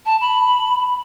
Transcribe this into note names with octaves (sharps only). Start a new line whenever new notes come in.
A5
B5